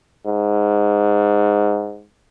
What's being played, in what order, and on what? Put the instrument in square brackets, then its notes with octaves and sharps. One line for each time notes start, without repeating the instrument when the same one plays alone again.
[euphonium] G#2